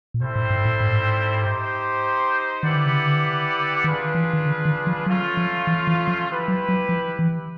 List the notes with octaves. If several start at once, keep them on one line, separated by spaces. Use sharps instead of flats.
A#2
B2 G3 C4 E4 A4 C5
A2
G#2
A2
G#2
A2
G#2
D#4 G4 C5
D#3 E4 G4 B4 D5 F#5
D3
C#3
D3
D#3 D4 F4 G#4 B4
E3
D#3
D3
D#3
F3
F#3 A3 C#4 F4
F3
E3
E3
F3
E4 G4 B4
F#3
F#3
F3
E3